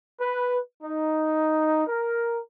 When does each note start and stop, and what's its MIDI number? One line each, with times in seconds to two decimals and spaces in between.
0.20 0.59 71
0.83 1.83 63
1.87 2.39 70